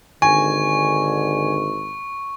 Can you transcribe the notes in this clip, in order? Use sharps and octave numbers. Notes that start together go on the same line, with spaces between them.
G#1 D3 G#5 C#6